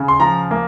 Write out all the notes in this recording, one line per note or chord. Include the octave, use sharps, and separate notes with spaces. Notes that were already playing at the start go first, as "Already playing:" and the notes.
Already playing: C#3
C6
F3 A#5
A#3